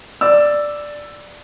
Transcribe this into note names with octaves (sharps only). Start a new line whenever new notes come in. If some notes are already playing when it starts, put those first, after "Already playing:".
D5 E6